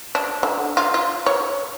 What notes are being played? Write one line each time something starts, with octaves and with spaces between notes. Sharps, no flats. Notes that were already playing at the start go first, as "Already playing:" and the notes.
D4
D3
F4
F4
C#5